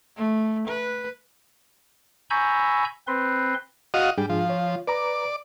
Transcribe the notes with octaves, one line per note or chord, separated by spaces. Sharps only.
A3
B4
G#5 A#5 B5 C#6 E6 G6
C4 B4 C6
F#4 D#5 F5
G#2 G3 D4 G#4
F3
F4 C#5
B4 D5 A#5 D6